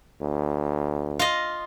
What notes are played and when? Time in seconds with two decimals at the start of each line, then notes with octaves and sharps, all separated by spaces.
0.21 D2
1.19 F4 D#5